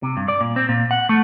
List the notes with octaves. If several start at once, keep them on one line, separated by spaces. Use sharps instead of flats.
C3
G2
D5
A#2
C4
A#2
F#5
A3